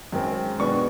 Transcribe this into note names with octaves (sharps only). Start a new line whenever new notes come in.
F#2 D#3 G#3 C4
B2 G#3 B3 D4 C#6